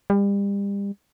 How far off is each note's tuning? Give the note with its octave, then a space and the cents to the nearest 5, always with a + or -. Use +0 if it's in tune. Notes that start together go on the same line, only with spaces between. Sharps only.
G3 +35